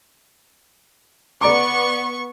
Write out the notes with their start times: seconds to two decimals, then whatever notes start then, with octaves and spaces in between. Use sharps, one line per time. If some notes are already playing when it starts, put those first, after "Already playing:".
1.41 B3 D5 A#5 C#6 D6